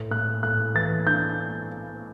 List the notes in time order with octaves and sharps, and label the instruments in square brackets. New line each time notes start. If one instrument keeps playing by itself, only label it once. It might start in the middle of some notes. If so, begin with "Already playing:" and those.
Already playing: [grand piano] A2
A2 F#6
A2 F#6
E3 A6
D4 G6